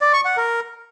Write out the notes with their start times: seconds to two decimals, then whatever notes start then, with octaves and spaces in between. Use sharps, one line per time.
0.01 D5
0.13 C#6
0.25 F#5
0.37 A#4